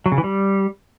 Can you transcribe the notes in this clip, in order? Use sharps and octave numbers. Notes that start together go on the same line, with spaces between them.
F#3
C#3
E3
G3